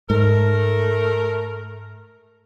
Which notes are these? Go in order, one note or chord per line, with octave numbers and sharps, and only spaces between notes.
G#2 A3 A#4